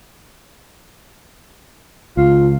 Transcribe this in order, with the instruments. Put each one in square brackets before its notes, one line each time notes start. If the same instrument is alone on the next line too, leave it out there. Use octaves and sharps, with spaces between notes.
[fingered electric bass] C#2 [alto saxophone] F4